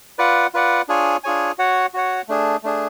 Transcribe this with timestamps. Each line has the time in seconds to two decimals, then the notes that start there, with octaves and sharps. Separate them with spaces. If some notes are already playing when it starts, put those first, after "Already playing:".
0.18 F4 B4 D5 F#5
0.54 F4 B4 D5 F#5
0.88 D4 F4 G#4 C#5 G#5
1.24 D4 F4 G#4 C#5 G#5
1.58 F#4 C#5 F#5
1.94 F#4 C#5 F#5
2.28 A3 D4 G#4
2.63 A3 D4 G#4